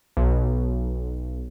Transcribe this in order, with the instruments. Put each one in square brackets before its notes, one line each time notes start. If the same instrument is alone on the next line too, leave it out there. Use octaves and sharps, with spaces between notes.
[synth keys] B1